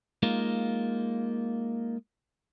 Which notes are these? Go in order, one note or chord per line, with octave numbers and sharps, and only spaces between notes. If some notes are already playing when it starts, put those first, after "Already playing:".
G#3 A#3 D#4 F4